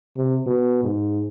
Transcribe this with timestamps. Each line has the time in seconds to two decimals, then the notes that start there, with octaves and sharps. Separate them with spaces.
0.17 C3
0.47 B2
0.84 G#2